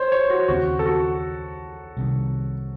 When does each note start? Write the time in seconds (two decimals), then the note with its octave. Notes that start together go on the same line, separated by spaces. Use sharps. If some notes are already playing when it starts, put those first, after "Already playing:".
Already playing: C5 C#5
0.12 C#5
0.30 F#4
0.48 D#2 C#3 A3 C4 F#4
0.79 A4
0.86 F#4
1.97 C2 C3 D#3